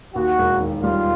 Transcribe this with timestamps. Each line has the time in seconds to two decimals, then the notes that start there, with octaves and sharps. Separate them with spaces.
0.15 D#2 F#4
0.38 E1
0.60 D#3
0.83 G3 F4